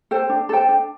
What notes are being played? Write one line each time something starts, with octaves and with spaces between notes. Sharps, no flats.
A4 C5 G5
D4
A4 C5 G5
D4